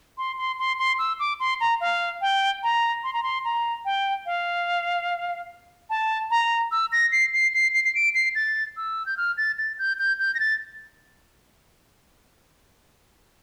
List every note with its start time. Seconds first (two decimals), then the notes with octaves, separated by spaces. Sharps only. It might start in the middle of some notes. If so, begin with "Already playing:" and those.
0.18 C6
0.38 C6
0.59 C6
0.79 C6
0.99 E6
1.19 D6
1.40 C6
1.61 A#5
1.81 F5
2.21 G5
2.63 A#5
3.04 C6
3.13 A#5
3.23 C6
3.45 A#5
3.85 G5
4.26 F5
5.90 A5
6.31 A#5
6.72 E6
6.92 A#6
7.12 C7
7.33 C7
7.54 C7
7.74 C7
7.84 C7
7.95 D7
8.14 C7
8.35 A6
8.77 E6
9.06 G6
9.17 F6
9.37 A6
9.58 A6
9.79 G6
9.99 G6
10.19 G6
10.35 A#6
10.40 A6